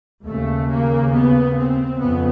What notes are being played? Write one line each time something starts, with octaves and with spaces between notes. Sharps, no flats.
D#2 C#3 A3
A#3
B3
C4
F2 C#3 B3